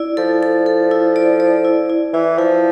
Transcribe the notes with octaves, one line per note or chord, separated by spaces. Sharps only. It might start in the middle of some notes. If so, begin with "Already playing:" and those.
Already playing: E4 D5
F3 A4
A4
A4
E4
D5
D5
E4
E4
E3 E4
F3 E4